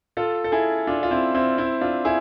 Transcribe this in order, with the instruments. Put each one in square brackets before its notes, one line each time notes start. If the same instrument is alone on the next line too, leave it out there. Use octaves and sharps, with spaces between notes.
[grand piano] F4 A4
A4
E4 G#4
D4 F4
F4
C4 E4
C4 E4
C4 E4
D4 F4
E4 G#4